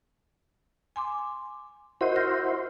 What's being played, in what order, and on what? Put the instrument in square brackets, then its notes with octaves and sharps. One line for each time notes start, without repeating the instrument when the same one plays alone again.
[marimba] G#5 C6 D6
[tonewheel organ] E4 F#4 C5 [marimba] A#4 D#5
[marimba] F6 G6 A#6